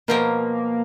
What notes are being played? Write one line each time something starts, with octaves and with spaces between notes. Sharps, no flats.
B2 F3 A#3 A#4